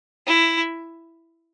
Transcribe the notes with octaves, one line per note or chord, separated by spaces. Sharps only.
E4